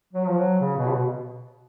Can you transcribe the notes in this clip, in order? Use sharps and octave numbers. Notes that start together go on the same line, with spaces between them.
F#3
F3
F#3
C#3
B2
C#3
B2